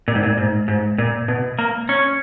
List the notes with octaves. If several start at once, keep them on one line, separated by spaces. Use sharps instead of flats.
A#2
G#2
A#2
G#2
G#2
A#2
B2
A#3
C#4